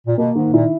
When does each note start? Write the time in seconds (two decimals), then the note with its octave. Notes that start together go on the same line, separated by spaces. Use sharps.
0.07 A#2
0.17 B2 A#3
0.35 G#2 D#3
0.52 A#2 E4